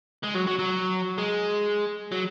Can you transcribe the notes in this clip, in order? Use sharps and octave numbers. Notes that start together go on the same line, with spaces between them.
G#3
F#3
F#3
F#3
G#3
F#3